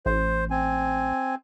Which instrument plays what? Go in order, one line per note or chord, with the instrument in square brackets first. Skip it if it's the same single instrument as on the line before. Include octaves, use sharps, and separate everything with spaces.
[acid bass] A1 [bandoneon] C5
[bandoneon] C4 G#5